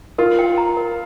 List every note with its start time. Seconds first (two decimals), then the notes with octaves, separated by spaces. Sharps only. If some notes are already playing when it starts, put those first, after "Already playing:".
0.18 F4 A#4
0.39 G5
0.58 A#5
0.77 A#4